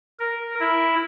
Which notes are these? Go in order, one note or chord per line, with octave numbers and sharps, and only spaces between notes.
A#4
E4